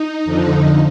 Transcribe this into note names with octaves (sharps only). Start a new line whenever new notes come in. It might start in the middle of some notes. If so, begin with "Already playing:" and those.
Already playing: D#4
F2 D3 F3